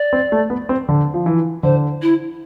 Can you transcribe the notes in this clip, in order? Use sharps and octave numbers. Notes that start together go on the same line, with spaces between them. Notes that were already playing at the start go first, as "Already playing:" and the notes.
Already playing: D5
C4
A3
B3
C4
D3
F3
E3
D3 C5
E4